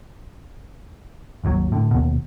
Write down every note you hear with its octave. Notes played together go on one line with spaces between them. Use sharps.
G#1 D#2 B2 F#3
A2 D3
D#2 B2